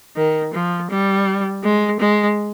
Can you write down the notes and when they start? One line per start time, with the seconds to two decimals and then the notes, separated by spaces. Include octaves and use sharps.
0.16 D#3
0.54 F3
0.90 G3
1.63 G#3
2.00 G#3